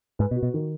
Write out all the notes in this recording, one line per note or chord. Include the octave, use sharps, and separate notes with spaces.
G#2 B4
B2
F#4
B2
D#3